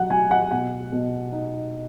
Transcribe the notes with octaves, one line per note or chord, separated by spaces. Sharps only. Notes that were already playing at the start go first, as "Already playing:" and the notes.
Already playing: F#3 F#5
F#3 G#5
F#5
B2 F#5
B2
D#4